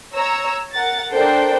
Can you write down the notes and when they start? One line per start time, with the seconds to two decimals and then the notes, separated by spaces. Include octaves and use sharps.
0.14 C#5 A#5 E6
0.74 A#4 F#5 A6
1.12 D4 A4 A#4 C5 G5